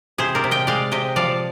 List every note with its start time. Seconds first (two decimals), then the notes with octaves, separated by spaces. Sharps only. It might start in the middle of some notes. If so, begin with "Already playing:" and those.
0.18 C3 G#4 C5
0.35 A#4 D5
0.44 C3
0.51 D#5 G5
0.67 G#3 D5 F5
0.92 C3 D#5 G5
1.16 F3 D5 F5